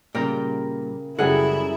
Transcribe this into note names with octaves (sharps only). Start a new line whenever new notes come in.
A#2 C#3 G3 A#4 G5
F#2 C#3 G3 E4 G#4 A4 F#5